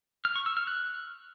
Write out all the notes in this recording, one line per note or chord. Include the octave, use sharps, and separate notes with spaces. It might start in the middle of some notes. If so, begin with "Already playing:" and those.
F6
C#6
E6
F6
F#6